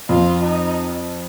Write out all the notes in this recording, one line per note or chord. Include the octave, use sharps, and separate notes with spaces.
F2 F3 F4
D#4